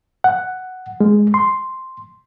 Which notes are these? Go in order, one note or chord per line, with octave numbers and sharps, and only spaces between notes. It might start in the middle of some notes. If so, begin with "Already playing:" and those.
F#5
G#3
C6